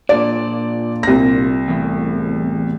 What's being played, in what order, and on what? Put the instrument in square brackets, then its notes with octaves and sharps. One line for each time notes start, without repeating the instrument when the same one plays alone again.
[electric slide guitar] A#2 D4 [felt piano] D5
[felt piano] C2 A#6
[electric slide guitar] E2 A2